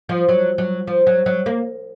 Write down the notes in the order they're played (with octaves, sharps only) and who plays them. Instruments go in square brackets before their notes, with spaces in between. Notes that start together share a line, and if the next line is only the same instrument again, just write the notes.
[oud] F3
F#3
F#3
F3
F#3
F#3
A#3